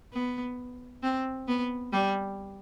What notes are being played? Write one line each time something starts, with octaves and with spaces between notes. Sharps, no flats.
B3
C4
B3
G3